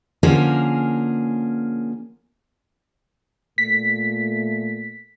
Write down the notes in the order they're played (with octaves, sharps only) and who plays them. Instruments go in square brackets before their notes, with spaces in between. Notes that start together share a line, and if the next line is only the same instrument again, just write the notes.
[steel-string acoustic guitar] D3 F3 A#3 C#4 G#4 A#4
[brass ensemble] A#2 A3 [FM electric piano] B6